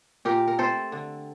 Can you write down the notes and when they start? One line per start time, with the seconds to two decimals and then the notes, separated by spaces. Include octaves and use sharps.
0.25 A#2 G4 A#4
0.48 A#4
0.58 A3 C4 A4 C5
0.92 D3